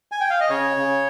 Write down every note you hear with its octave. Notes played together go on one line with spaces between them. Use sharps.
G#5
G5
F5
D#5
C#3 C#5
C#3